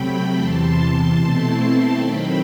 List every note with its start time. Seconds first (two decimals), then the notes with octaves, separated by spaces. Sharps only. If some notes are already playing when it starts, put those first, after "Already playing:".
Already playing: C3 F#3 A3 G5 B5
0.33 E2 C3 E3 A5 C6
1.13 B2 A3 C4 E4
1.92 D#3 F#3 A3 C4 G5 B5